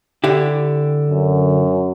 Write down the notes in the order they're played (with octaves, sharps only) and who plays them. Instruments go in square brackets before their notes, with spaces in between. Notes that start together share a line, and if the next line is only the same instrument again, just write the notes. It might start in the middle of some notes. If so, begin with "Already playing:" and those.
[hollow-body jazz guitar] D3 E4 G4
[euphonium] F#2